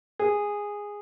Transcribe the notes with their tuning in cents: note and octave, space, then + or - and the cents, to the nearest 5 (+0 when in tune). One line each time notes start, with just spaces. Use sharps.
G#4 -10